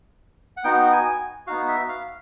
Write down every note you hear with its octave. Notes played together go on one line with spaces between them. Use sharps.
F#5
B3 D#4 F#4 G5
G#5
B3 D#4 F#4 F5
E5
F5